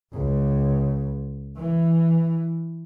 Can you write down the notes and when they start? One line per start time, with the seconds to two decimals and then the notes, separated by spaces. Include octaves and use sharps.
0.13 C#2
1.60 E3